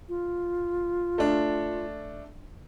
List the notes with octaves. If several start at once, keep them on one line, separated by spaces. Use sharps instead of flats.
F4
A3 D4